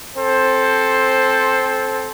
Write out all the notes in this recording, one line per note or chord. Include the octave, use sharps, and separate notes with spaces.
C4 A4 C5